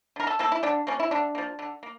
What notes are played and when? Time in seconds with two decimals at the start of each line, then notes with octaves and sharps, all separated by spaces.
0.16 D3 A#4
0.27 A4
0.39 F3 A#3 A4
0.52 E4
0.63 D3 D4
0.87 F3 A#3 C#4
1.00 E4
1.11 D3 D4
1.35 F3 A#3
1.59 D3
1.83 A#3